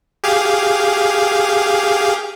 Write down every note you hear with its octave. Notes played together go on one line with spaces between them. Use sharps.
G4 G#4 F5